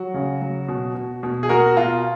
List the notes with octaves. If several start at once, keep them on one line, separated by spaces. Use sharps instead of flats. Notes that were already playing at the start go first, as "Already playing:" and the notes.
Already playing: F#3 F#4
C#3
F#3
B2
B2
B2
G#4
B2 F#4 A#4
B2 F4